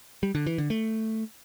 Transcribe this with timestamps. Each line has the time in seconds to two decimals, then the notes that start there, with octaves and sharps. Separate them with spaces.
0.23 G3
0.35 D3
0.46 E3
0.58 D3
0.70 A3